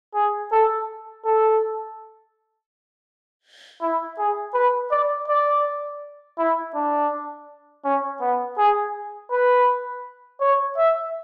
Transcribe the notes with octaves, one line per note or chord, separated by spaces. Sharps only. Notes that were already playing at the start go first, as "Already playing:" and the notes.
G#4
A4
A4
E4
G#4
B4
D5
D5
E4
D4
C#4
B3
G#4
B4
C#5
E5